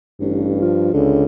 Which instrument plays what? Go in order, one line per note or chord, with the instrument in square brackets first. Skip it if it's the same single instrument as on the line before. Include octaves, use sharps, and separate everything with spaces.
[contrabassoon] A1 [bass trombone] G2
[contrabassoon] F3
[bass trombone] C#2 [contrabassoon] D3